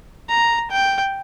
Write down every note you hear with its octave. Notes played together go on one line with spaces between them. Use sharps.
A#5
G5